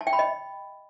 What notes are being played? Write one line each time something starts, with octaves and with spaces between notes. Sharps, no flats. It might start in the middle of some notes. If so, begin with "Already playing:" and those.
A5
G5
B5
D#5